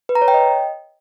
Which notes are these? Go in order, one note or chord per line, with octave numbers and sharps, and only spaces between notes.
B4
A#5
C#5
G5
D#5